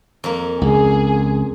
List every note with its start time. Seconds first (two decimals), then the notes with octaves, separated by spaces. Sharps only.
0.24 F2 A#3
0.62 C#2 G#4